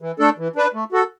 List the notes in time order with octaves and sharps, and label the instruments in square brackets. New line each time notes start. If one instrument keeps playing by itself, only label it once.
[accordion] E3
A3 D4 A4
E3
D4 B4
A3
F#4 A4